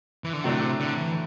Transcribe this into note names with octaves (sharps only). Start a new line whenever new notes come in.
E3
D3
A2 C3 F#3 A3 D4
D3
E3